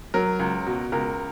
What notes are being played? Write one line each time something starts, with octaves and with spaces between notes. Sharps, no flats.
F#3 A#4
C#2
B2
C#2 A#4